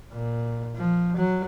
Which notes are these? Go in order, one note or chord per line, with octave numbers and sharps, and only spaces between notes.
A#2
F3
F#3